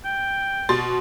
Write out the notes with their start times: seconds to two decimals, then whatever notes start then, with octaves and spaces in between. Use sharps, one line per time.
0.05 G5
0.69 B2 C6 A6